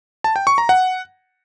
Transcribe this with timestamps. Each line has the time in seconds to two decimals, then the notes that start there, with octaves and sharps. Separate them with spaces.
0.24 A5
0.36 G5
0.47 C#6
0.58 A#5
0.69 F#5